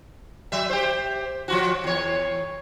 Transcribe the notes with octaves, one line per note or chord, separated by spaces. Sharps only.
F#3 E5
G4 C5
F3 F4 F#4
E2 C#5